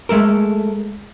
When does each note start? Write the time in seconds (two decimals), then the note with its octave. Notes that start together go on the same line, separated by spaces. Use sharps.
0.09 G#3 A3 A4 A#4